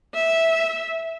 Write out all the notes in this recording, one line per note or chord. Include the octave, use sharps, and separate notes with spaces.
E5